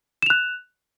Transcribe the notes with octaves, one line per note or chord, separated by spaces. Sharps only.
F#6 E7 F7